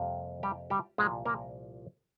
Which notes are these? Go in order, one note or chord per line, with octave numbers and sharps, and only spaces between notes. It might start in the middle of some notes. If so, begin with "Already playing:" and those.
Already playing: F2 C3 G3 A#3
G3 G4
G3 G4
C2 A#2 F3 G#3 G#4
A#3 A#4